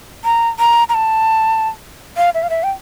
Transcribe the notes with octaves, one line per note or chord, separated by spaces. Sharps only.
A#5
A#5
A#5
A5
F5
E5
F5
E5
G5